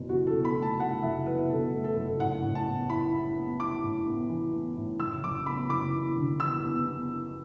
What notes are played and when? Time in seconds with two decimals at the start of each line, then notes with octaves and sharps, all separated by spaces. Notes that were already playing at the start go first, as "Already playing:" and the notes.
Already playing: F#1 B2
0.09 E2 F#4
0.27 A4
0.33 B2
0.45 B5
0.56 A3
0.62 A5
0.80 A3 F#5
1.03 F#1 E5
1.26 E2 B4
1.49 B2 A4
1.73 A3
1.84 A4
1.96 F#1
2.20 A2 F#5
2.43 A2
2.55 A5
2.66 B3
2.89 E4 B5
3.14 E4
3.36 B3
3.60 E4 D6
3.83 A2
4.06 B3
4.29 E3
4.53 B3
4.77 A2
5.00 F#1 E6
5.23 F#1 D6
5.46 B3 B5
5.70 F#1 D6
5.93 E2
6.17 D3
6.40 E2 E6
6.63 B3
6.87 B3